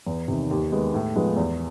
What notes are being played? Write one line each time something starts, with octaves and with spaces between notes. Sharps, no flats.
E2
C3 D#3
D#2
D#3 G#3 B3
A2
F3 G#3 B3
E2